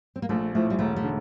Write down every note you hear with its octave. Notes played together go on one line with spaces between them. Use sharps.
C4
A#3
A#1 A3
A2 F3 A3
G3
E1 A3
A3
D3